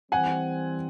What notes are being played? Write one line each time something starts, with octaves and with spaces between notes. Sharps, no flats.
E3 G3 C4 F#5 G#5